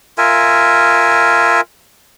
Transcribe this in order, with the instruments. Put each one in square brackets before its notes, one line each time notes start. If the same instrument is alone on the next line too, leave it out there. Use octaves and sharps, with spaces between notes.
[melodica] F4 A#4 E5 G#5